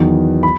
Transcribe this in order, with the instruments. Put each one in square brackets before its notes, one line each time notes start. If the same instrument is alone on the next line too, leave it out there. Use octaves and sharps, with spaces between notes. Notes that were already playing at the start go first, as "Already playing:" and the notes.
Already playing: [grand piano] E2 D#3 F#3 B3
B5